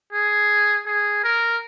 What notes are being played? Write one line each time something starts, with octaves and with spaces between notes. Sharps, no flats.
G#4
G#4
A#4